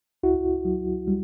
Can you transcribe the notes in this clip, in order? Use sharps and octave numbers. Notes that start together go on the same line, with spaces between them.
C#2 E4 F#4
F#3
G3